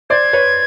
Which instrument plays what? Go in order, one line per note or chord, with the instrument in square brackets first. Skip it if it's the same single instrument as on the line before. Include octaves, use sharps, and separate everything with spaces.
[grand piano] C5 D5 [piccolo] G#6
[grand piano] B4 C#5